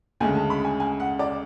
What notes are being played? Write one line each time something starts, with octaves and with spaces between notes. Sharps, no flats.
D2 C#3 G#3 C#4 G#5
A5
B5
G#5
G#5
F#5
D5